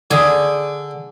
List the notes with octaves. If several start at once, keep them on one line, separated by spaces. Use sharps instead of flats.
D3 G#4